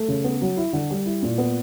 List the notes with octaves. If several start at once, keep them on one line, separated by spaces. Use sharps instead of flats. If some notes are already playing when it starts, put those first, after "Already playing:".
Already playing: A3
C#3
B3
F#3
E4
D3
G3
E4
A#2
B3